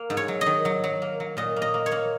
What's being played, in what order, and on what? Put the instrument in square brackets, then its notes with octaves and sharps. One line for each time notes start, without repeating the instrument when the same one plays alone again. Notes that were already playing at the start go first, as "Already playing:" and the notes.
Already playing: [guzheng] A#3
G#2
C#5
F#3
D#5
D#3
F#3
F#3
A#3
F#3
A#2 D#5
A#3
D#5
A#3
C#5
A#3